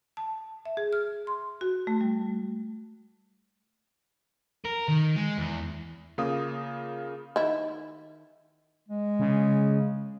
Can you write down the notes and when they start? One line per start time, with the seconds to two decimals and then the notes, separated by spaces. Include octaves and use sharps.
0.17 A5
0.66 E5
0.77 G#4
0.93 F6
1.27 C6
1.61 F#4
1.87 A3
2.01 G3
4.65 A#4
4.89 D#3
5.16 G#3
5.38 E2
6.18 C#3 A#3 F4 F5 D#6
7.36 D#3 E4
8.88 G#3
9.20 C#3